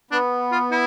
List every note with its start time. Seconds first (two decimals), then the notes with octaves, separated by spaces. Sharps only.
0.11 B3 D4
0.52 F4
0.71 E4